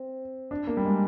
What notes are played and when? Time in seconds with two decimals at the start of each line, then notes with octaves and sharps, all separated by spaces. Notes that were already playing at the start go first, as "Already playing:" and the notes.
Already playing: C4
0.51 D4
0.67 A#3
0.77 G3
0.85 G#3